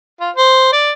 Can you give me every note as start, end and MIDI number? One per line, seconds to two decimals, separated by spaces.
0.21 0.30 65
0.36 0.71 72
0.73 0.91 74